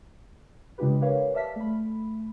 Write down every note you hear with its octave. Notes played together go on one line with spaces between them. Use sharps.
C#3 G#3 D4 F4 G4 B4
G4 A#4 B4 C#5 F5
D5 E5 F5 A5 F6 B6
A3 B5